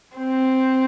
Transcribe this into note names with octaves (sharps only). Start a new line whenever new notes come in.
C4